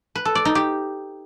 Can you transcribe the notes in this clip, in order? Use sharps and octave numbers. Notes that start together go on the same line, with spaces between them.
B4
A4
D5
D#4
G4